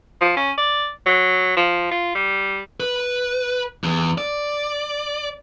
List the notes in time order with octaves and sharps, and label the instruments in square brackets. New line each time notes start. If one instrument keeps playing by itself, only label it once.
[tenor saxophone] F3
C#4
D5
F#3
F3
F4
G3
[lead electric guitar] B4
E2
D5